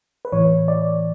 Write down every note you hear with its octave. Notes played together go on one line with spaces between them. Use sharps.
B4
A2 E3 C#5
D5